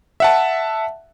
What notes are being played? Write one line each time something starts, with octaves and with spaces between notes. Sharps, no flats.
E5 F#5 A5